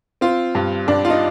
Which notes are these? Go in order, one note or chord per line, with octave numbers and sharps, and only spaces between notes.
C4 F4
G2
G2 D4
F4
D#4